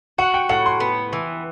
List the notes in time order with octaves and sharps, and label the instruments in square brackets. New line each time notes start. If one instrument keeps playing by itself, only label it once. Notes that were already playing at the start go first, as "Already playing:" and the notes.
[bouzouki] F#4 [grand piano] F#5
[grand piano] G5
[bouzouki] A2 [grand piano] F#5
[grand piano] C6
[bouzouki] B3
E3